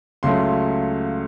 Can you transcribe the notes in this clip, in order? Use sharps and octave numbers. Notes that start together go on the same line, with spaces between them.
C#2 C#3 F#3 A3 C6